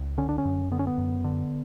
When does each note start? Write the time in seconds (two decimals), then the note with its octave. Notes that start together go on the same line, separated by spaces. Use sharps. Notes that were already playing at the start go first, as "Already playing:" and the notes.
Already playing: C#2
0.18 D3 C#4
0.29 D4
0.38 C#4
0.45 F#2
0.71 D3 B3
0.79 C#4
0.87 B3
0.98 F#2
1.24 D3